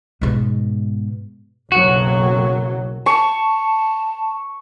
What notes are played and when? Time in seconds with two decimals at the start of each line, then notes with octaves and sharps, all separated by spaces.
0.21 G#2 B2
1.72 F#1 B1 F#3 F#4
3.06 A5 C#6